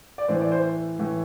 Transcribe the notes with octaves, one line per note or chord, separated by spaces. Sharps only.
D5
A2 E3 C5
D5
C5
A2 E3